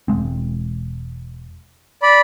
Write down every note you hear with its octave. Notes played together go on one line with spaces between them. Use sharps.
E1 G#3 C4
D5 B5